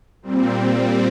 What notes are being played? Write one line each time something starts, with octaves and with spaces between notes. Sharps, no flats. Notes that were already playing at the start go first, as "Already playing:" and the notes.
A#2 G3 C4